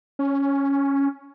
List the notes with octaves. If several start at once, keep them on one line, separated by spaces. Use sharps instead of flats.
C#4